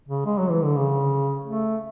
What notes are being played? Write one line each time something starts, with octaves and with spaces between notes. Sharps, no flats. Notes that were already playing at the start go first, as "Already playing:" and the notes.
C#3
G#3
F#3
E3
D3
C#3
A3